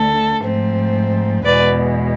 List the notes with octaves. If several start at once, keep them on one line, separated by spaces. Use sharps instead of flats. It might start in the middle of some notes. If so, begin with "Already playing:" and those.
Already playing: D2 D3 A3 A4
G#2 F3 A3 C4
E2 B2 G#3 B4 D5